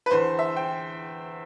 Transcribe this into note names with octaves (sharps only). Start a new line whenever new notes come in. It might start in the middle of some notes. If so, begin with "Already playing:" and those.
B4
E2 D3 C5
E5
G5